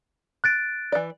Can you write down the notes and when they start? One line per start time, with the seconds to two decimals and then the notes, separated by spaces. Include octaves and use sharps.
0.44 F#6 A6 D7
0.92 E3 D5